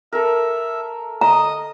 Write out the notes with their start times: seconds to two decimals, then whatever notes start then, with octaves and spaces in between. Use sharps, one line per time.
0.13 A4 A#4 E5
1.21 D#5 A#5 D#6